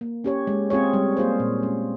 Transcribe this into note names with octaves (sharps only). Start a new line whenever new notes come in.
A#3
C#4 G4 C#5
G#3
C4 F4 G#4 C#5
G3
A#3 F4 G#4 C5
A#2
G#3 C#4